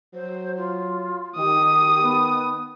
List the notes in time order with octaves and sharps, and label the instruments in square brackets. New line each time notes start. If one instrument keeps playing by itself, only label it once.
[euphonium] F#3 [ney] C5
[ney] F4
[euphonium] D#3 [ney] G4 [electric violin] D#6
[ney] B3